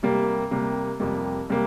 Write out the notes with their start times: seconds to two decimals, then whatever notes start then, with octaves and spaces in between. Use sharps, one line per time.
0.03 C3 G3 A#3
0.51 C3 G3 A#3
1.00 F2 C3 G3 A#3
1.49 C3 G3 A#3